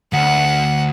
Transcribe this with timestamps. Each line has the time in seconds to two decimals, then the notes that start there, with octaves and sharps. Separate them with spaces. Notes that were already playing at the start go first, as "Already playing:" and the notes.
0.13 D2 F#5